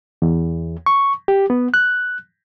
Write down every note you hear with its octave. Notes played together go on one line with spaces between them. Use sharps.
E2
C#6
G4
B3
F#6